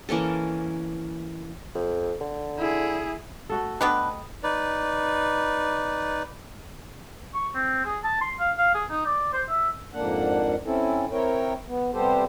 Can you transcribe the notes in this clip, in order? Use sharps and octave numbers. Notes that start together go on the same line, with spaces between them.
E3 A#3 C#4 A4
F2
D3
E4 G#4
A3 F#4 A4
B3 D4 B4 D#5 G5
D#4 B4 D5
C#6
C4
G#4
A5
C6
F5
F5
G#4
D#4
D5
C5
E5
F2 G#2 A#3 D4 F#5
C4 C#4 E4 A4
C4 E4 A#4 C#5 G5
B3
C3 G3 B3 G4 A4 C5